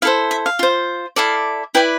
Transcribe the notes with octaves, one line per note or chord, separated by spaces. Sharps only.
E4 A4 C5 F5
E5
F5
F4 C5
E4 A4 D5 F5
E4 B4 D5 G5